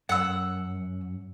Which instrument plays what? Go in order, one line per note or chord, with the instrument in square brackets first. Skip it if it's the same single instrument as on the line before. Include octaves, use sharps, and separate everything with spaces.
[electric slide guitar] F#2 [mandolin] F#5 E6